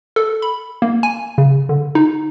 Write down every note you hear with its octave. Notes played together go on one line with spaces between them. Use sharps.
A4
B5
A#3
G#5
C#3
D3
D#4